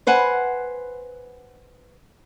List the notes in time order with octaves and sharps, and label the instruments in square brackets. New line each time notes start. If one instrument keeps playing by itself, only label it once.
[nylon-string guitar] B4 C5 F#5 G#5